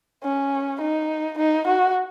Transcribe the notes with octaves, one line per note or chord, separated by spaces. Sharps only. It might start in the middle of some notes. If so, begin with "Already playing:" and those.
C#4
D#4
D#4
F#4